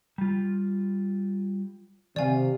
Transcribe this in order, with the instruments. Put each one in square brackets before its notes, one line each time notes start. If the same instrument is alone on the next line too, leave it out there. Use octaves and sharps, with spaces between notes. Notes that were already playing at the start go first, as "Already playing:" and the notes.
[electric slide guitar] G3 F4
[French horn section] C3 [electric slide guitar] D#3 F5 [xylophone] D5 G#5